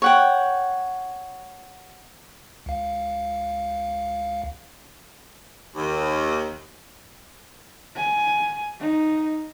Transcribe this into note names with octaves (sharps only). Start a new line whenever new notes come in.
C#5 F#5 G5
C#2 F5
D#2
G#5
D#4